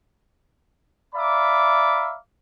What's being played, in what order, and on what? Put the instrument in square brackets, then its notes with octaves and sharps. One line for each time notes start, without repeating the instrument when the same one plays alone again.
[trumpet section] D5 E5 F5 A#5 B5 D6